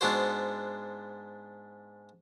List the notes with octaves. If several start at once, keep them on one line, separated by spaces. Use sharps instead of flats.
G#2 B3 D4 F#4 C5